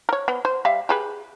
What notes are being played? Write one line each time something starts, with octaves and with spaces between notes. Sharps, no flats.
A#4 C#5
B3
C5
G3 E5 F5
G4 G#4 B4